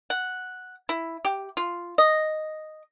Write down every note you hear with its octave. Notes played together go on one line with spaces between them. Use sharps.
F#5
E4
G4
F4
D#5